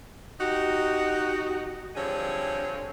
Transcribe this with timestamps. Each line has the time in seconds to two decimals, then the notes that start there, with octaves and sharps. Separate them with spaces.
0.40 D#4 F#4 G4
1.96 D3 F3 G3 C4 G#4 C#5